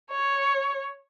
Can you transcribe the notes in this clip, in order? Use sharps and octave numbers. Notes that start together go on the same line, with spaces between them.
C#5